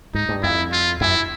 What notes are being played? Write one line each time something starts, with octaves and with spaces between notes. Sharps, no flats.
G#2 D#4
G2
F2 E4
F4
F#2 E4